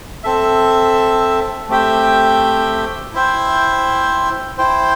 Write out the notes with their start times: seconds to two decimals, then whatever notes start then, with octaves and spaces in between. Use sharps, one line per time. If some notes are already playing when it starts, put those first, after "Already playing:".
0.24 C4 A4 E5
1.69 A3 C4 G4 E5 G5
3.13 E4 C5 E5 G5
4.58 E4 C5 G5